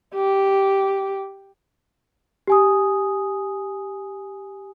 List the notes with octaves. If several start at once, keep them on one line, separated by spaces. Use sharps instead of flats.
G4
G4 G#5 D#6